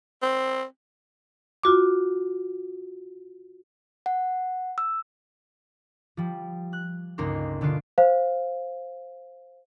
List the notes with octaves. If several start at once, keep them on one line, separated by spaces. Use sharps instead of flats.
C4
F4 F#4 D6
F#5
E6
F3 G3
F#6
G1 C#2 A#3 D#4 A#4 C6
B2 D3 A3 F4 C6 D7
C5 F5